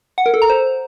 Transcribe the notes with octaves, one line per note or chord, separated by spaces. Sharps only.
F#5
A#4
A4
A#5
C5